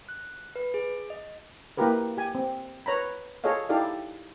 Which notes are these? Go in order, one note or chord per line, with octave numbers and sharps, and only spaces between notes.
F#6
B4
G#4
D#5
A#3 E4 F4 G4 A#4 B4
G4 G#5
C4
B4 C#5 A#5 B5
F4 G#4 A4 C#5 D#5 F5
D#4 E4 G4 A4 D5 F5